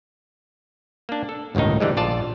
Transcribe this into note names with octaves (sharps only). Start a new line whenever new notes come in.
A#3 D4
A4
G1 C#2 A2 D#3 D#4
D3 E3 G3 G#3
A#1 F4 D5 A5